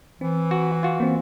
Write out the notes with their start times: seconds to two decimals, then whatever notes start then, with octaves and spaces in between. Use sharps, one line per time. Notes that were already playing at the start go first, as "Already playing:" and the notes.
0.21 E3 C4
0.51 F#4
0.83 F4 F#4
1.00 E3 A#3 C4